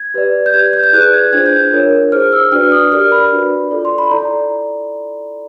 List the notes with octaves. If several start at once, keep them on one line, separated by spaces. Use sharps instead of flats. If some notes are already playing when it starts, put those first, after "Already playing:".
Already playing: G#6
G4 B4 D5
G6
G4 B4 D5 G#6
G6
G6
E4 G#4 B4 D5 F#6
G#6
D4 F4 G#4 C5 G#6
G6
D4 F4 A#4 C#5
E4 G#4 C5 F6
E6
D4 F#4 B4 D5 F6
D#6
G4 A#4 D5 F6
B5
D4 F#4 B4 D5
F4 A4 D5
C6
B5
E4 A4 D5 A#5